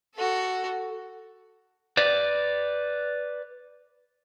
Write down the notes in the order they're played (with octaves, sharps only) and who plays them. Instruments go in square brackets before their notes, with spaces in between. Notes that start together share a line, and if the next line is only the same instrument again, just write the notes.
[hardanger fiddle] F#4 A4
[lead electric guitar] B4 D5